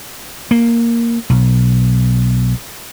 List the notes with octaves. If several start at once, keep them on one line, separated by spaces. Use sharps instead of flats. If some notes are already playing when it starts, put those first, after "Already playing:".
A#3
B1